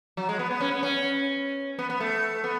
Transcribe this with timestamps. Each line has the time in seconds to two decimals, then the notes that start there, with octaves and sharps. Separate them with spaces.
0.17 F#3
0.29 G#3
0.39 B3
0.51 B3
0.61 C#4
0.71 B3
0.83 C#4
1.79 B3
1.90 B3
2.00 A3
2.44 B3